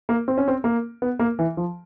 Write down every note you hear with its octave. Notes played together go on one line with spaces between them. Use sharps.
A#3
C4
C#4
C4
A#3
B3
A#3
E3
F3